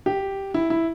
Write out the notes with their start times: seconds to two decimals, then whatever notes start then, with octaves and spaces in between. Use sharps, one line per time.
0.06 G4
0.54 E4
0.70 E4